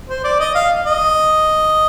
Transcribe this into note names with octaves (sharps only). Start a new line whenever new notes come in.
C5
D5
D#5
F5
D#5